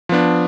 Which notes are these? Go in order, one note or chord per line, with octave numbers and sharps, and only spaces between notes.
F3 B3 D4